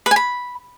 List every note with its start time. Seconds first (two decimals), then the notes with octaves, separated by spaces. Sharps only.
0.06 B4
0.11 G#5
0.16 B5